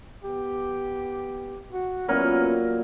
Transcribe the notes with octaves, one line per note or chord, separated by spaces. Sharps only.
B3 G4
F#4
A#2 F#3 B3 C#4 E4 A#4